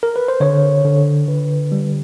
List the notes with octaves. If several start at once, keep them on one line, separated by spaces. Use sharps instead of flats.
A#4
B4
C5
D3 C#5
D3
D3 B4
G3